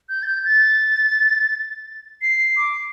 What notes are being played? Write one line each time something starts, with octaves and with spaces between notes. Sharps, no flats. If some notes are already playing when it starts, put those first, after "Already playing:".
G6
A6
G6
A6
C7
D6